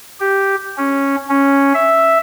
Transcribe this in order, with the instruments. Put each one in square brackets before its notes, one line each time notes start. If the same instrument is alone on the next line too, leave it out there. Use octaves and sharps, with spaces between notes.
[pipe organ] G4
C#4
C#4
E5